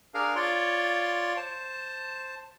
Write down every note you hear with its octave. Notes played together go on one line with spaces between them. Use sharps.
D4 G#4 A#4 F5
F4 C#5 D5 C6
C5 A5